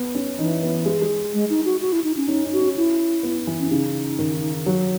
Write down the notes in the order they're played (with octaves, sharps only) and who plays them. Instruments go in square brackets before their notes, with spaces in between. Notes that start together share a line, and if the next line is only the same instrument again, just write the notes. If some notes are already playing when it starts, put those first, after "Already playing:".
Already playing: [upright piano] B3
C#4
[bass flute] E3 [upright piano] D#4
[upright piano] B3
G#3
G#3
[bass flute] G#3
D#4
F#4
F#4
E4
D#4
C#4
[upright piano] C#4 [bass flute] D#4
[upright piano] D#4
[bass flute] F#4
[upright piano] C#4
[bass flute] E4
[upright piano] B3
E3
[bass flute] C#4
[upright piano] C#3 [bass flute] D#4
[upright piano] D#3
F#3